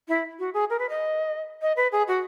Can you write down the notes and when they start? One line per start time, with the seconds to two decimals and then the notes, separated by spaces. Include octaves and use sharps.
0.08 E4
0.39 F#4
0.54 G#4
0.70 A#4
0.79 B4
0.89 D#5
1.62 D#5
1.77 B4
1.92 G#4
2.08 F#4